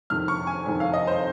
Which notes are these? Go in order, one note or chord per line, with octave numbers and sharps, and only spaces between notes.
F2 C3 D#3 F6
C#6
G#5
F2 C3 D#3
F5
D#5
C5